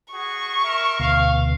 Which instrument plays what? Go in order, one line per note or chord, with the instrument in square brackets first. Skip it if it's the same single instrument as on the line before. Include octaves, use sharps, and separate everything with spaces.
[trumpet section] F#4 G#4 [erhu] C#6
[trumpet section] A#4 E5
[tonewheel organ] D2 B2 [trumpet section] F5